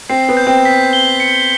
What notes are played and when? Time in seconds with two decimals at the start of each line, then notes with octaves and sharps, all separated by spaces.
0.09 C4 C7
0.29 B3
0.37 G6
0.47 C4
0.65 B6
0.93 G7
1.20 C#7